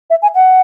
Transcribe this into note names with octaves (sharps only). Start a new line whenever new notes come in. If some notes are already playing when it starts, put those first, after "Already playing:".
E5
G#5
F#5